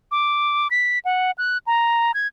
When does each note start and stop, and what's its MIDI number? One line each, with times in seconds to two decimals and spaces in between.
0.11 0.68 86
0.71 0.99 95
1.05 1.31 78
1.38 1.58 90
1.67 2.12 82
2.14 2.27 92